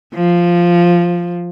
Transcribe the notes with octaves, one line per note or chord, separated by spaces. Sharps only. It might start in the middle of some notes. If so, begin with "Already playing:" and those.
F3